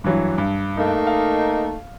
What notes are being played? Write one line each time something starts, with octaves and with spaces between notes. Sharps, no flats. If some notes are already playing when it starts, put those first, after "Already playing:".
G2 E3 F#3
G2
A3 A#3 D#4
F5